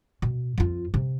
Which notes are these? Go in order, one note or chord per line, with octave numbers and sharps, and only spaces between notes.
B2
F2 F4
C3